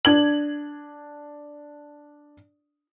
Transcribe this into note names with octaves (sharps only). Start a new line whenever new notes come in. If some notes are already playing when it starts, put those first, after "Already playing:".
D4 G#6 F#7